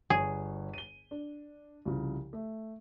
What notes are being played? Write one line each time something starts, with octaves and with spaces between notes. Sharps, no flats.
G1 G#4 C#5
D#7 G7
D4
C2 C#3 F3
A3